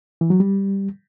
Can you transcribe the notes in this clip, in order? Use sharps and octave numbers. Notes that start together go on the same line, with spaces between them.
E3
F#3
G3